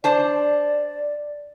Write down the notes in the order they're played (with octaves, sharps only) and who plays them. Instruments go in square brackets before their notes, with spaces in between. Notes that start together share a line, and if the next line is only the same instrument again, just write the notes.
[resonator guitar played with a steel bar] D4 C5 A5 [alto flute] D5